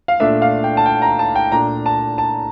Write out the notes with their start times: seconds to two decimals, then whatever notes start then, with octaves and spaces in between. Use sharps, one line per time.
0.08 F5
0.20 A#2 A3 D4 E5
0.42 F5
0.64 G5
0.77 A5
0.86 G5
1.02 A#5
1.19 A5
1.36 G5
1.52 A#2 A3 D4 A#5
1.86 A5
2.18 A5